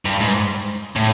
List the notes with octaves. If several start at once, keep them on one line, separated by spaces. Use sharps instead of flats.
G2
G#2
A2